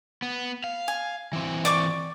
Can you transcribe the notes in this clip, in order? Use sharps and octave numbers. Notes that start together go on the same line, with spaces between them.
B3
F5
G#5
E3 C4
D5 C#6 D6